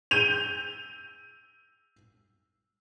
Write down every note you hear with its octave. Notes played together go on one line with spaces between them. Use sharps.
G6 D#7 F7